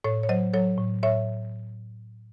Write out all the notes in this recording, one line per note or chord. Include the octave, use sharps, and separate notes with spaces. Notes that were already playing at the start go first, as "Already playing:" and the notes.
A2 A4 C#5
C#5
F#3 C5 D#5
F#3 A4 C#5
A2
A2 C#5 E5